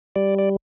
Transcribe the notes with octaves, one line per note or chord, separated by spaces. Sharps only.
G3 D5
D5